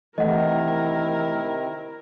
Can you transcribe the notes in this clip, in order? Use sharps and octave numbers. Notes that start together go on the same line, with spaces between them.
C3 D#3 E3 A3 E4 A#4 D#5 F#5